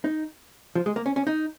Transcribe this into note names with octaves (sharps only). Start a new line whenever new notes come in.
D#4
F3
G#3
A#3
C#4
C#4
D#4